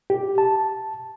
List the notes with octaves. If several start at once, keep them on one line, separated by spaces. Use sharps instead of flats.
G4
A5